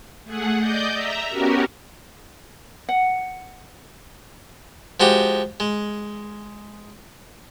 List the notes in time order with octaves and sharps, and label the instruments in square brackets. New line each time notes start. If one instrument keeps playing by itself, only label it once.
[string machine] A3 G#4 F#5
D5 D#5 G6
E5 A#5
B3 C#4 F#4 G4 A#4
[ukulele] F#5
[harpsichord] F3 G#3 F#4 G4
G#3